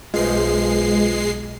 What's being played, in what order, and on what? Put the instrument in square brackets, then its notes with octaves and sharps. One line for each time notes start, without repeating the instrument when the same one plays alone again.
[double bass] B1 [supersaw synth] G#3 C7 [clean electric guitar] F4 B4 C5